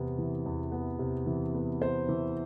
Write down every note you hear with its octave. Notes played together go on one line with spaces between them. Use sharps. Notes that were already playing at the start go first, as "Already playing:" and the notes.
Already playing: E2 C3 B3
E3
E2
B3
C3
E3
B3
B3 C5
E3